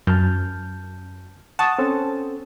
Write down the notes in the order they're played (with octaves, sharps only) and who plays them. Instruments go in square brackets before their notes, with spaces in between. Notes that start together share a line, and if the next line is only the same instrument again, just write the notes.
[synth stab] F#2 [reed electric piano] A5 F6 G6
[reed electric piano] F#5 C#6 D#6 [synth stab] A5
[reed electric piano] C4 C#4 A4